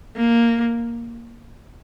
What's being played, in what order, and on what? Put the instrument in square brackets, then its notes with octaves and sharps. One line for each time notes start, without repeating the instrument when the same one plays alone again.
[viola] A#3